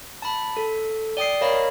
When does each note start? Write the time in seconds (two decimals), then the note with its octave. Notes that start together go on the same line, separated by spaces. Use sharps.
0.22 A5 B5
0.57 A4
1.17 D5 G5 D#6 C7
1.41 A#4 C#5 D#5 F5 B5